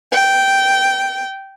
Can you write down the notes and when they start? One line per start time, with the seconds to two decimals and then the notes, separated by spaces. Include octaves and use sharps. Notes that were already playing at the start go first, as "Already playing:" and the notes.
0.13 G5